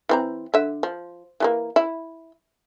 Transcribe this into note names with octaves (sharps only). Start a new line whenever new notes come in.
E3 C4 A#5
D3 E5
F3
E3 A3 A#3
E4